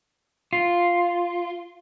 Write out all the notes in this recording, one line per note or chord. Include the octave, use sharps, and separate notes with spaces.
F4